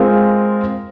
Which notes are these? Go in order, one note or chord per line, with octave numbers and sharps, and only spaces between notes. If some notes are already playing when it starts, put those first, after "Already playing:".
Already playing: G#3 C4 F4 A#4